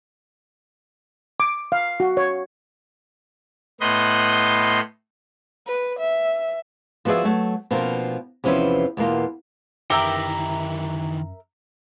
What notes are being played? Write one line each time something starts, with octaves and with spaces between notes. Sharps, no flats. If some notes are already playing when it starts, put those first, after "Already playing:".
D6
F5
F#4
C#5
A2 B3 B4 D#5 C6 G6
B4
E5
F3 B3 F#4 G#4 D5 E5
F#3 A3
B2 F3 A#3 C4 D4 A#4
E2 C3 F3 C#4 B4 E5
E2 B2 A#3 F4
F#2 D#3 E3 G4 A#4 E5 A#5